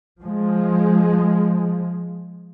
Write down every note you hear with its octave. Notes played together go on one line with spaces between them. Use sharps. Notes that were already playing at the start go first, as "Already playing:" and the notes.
F3 G#3